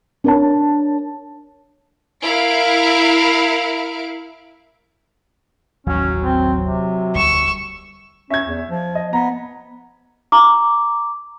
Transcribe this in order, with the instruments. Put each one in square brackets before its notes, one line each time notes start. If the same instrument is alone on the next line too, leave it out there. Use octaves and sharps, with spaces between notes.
[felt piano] D4 A#4 C#5 A5
[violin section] E4 A#4 F5 D7
[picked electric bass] D#1 A1 D#2 [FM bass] F#3 [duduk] C#4
[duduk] C4
C3
[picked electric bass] E1 D2 G3 [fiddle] C#6 E6
[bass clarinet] C#4 [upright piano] E5 G#6
[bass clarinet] E2
F3
[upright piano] D#5
[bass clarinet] B3 [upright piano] A#5
[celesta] A#5 D6